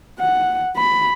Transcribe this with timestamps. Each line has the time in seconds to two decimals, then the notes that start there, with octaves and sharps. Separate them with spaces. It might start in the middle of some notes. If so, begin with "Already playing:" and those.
0.20 F#5
0.77 B5